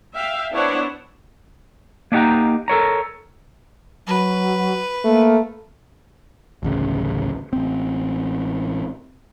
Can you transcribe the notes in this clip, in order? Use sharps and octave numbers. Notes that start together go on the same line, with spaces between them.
E5 F5 G5
B3 D4 E4 C5 C#5 F#5
A#3 D4 D#4 G4 F#5 A#5
A4 A#4 C#5 A#5
F#3 B4
A3 A#3
D1 A1 C#3
A1 C4